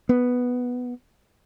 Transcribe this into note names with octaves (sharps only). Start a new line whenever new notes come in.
B3